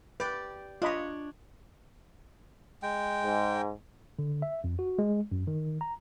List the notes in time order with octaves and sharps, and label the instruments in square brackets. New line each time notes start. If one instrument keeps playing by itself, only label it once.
[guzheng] G4 D5 [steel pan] B4
[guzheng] D4 C#5 [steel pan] F4 D#5 B5
[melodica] G#3 G5
[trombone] G#2
[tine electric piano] D3
E5
F2
F#4
G#3
F#2
D#3
A#5